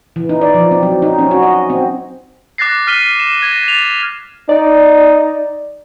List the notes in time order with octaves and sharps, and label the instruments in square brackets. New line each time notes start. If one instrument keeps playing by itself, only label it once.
[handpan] E3
D#4
D5
F3
C4
F#3
D#4
C#4
F#4
D#5
C4
[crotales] D6 F#6 A6 A#6 C7
F6 B6 D#7 G7
E7
G#6 A#6
A6 F7
[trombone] D#4 [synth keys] D5